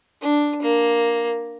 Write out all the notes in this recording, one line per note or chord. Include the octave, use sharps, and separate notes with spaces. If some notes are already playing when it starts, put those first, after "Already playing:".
D4
A#3